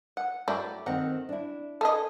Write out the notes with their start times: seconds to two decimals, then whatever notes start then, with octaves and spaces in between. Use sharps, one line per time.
0.17 F#5
0.48 F#3 A3 E4 G4 D5
0.86 D#3 C4 F#5 A#5
1.29 D4 E4
1.81 G#4 A4 D#5 E5 G#5